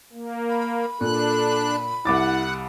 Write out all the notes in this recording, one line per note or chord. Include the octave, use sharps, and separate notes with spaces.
A#3
B5
A#2 D4 A4 F#6
C2 E4 F#5 D6 A6